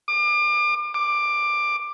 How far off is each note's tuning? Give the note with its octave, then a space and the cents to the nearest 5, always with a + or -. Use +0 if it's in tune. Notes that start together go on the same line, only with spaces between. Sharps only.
D6 +35
D6 +15